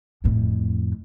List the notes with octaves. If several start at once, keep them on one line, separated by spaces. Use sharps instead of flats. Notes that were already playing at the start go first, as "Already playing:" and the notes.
F2 A2